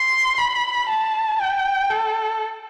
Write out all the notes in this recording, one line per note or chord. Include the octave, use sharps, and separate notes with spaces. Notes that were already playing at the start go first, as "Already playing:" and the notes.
Already playing: C6
B5
A5
G5
A4